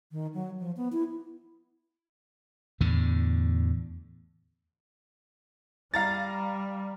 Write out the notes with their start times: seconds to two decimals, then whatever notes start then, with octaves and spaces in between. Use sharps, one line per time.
0.12 D#3
0.34 F#3
0.60 F3
0.77 B3
0.92 E4
2.81 E2 A2 D3
5.94 G3 F5 A#5 A6